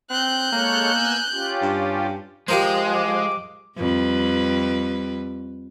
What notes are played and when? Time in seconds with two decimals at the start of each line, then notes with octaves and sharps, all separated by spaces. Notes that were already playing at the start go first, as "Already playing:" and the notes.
0.11 C4 F#6 G6
0.52 G#3 A#3 A4 C#5
0.92 B3 G#5 E6
1.32 C#4 F4 G4
1.62 G2
2.48 F3 G#3 G4 A#4 C5
2.95 D6
3.77 F2 G3 B4